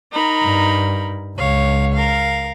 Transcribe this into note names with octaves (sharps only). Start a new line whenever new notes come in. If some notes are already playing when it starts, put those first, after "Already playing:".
D#4 A#4 B5
G2
C#2 C#5 F5
A#4 F5